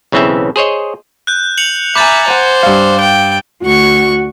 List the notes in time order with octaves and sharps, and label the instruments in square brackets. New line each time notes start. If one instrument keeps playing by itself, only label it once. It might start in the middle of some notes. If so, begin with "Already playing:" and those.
[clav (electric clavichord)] B1 C#3 E3 C4 C#4 E5
G#4 C5 C#5 D#5
[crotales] F#6 G6
C#7 F7 F#7
[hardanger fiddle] E5 A#5 [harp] G#5 B5 [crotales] D6 G6 A6
[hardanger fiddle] C5 [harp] F#5 G#5
[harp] G2 F5
[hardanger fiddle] G5
[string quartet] D2 C#6 [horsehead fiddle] F#4